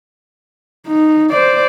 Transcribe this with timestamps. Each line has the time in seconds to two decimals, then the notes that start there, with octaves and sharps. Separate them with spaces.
0.87 D#4
1.31 C5 D5